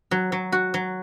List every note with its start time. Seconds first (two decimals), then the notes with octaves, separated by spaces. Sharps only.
0.11 F#3
0.32 F#3
0.52 F#4
0.74 F#3